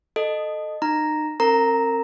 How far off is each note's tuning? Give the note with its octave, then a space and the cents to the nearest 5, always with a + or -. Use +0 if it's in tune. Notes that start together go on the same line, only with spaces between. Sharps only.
A4 +0 D#5 -15
D#4 -35 A#5 +0
C4 +40 A#4 -30 A#5 +0